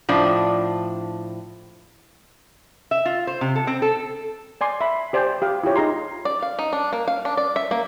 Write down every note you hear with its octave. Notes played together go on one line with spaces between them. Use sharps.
A2 F3 D4
E5
F4
C5
C3
A4
C4
A4
D5 G#5 C6 D6
E5 B5
G4 C5 D5 G5 G#5
G4 F5
E4 F4 G4 C#5
D#4 G#4 A#5 C6
D5
F5
D#4
D4
A#3
F5
D4
D5
E5
A#3